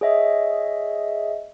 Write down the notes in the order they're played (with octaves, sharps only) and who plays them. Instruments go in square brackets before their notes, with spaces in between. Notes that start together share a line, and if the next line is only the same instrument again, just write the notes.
[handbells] G#4 C#5 D#5 E5